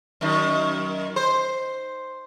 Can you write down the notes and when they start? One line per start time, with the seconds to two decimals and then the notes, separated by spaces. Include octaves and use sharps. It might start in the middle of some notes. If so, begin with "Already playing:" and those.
0.21 F#2 D#3
1.16 C5